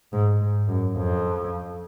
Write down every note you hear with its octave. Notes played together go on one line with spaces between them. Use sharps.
G#2
G#2
F#2
F2